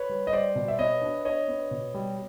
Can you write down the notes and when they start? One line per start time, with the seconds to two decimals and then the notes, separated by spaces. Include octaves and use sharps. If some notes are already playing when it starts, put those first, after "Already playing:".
Already playing: B4 C#5
0.09 G3
0.27 D#5
0.33 G3 C5 D5
0.55 B2
0.68 E5
0.79 B3 C#5 D#5
1.01 D4
1.25 D4 C#5 D#5
1.48 B3
1.71 B2
1.94 G3